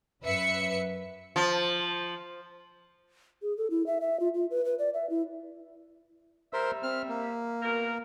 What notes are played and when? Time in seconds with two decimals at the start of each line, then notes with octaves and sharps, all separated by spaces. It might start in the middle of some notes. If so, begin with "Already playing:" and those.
0.23 F#2 B4 E5 C#7
1.36 F3
3.42 G#4
3.57 A4
3.70 E4
3.86 E5
4.01 E5
4.20 F4
4.35 F4
4.51 B4
4.65 B4
4.79 D5
4.94 E5
5.10 E4
6.53 G3 A#4 C5 E5
6.83 C4 F6
7.09 A#3
7.62 B2 A#4